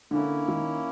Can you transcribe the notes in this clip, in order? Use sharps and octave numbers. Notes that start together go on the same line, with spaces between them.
D3 A#3 C#4 E4
D#3